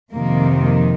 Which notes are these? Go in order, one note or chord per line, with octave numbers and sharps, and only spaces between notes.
F2 C3 D#3 A#3